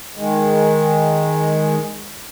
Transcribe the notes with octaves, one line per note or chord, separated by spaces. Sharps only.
D#3 G#3